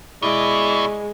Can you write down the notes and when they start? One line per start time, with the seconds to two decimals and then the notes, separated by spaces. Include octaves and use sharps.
0.22 B2 G#3 E4 D5